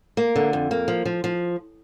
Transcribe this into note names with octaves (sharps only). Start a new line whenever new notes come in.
A#3
D3
F2
A#3
F3
F3
F3